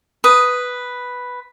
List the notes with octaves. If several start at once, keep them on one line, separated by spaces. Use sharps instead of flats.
B4 D#6